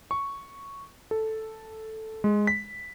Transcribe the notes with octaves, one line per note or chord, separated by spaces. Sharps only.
C#6
A4
G#3
B6